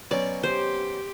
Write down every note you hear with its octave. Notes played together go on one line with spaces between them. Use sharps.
B2 F#3 C#4 D5
G4 C5